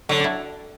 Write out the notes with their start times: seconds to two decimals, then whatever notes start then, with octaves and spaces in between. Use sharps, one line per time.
0.09 D3 F#3
0.20 D4 E4